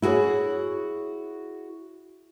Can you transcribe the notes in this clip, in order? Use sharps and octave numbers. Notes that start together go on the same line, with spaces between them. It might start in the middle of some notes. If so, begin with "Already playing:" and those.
E4 F#4 G#4 B4 C#5